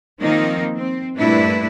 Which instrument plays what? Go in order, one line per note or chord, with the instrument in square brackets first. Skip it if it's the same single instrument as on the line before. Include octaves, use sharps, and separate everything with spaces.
[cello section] D#3 F3 A#3 C4 D#4
C4
G2 A#2 A3 D4 E4 B4